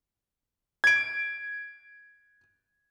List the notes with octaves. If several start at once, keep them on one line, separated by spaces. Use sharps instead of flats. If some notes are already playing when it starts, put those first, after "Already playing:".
G#6 D7